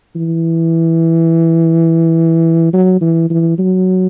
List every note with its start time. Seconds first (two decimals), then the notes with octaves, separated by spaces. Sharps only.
0.16 E3
2.73 F#3
3.01 E3
3.30 E3
3.59 F#3